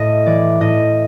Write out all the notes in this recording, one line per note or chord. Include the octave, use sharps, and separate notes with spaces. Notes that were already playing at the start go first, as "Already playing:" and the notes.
Already playing: A2 D#5
E3 D5
A2 D#5